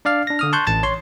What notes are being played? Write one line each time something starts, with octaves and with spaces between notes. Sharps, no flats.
D4 D5 F5 F6
D4 A#6
D3 D#6 F6
A5 C6 C#6 F#6 G6
A1 A5 A6
C#5 C6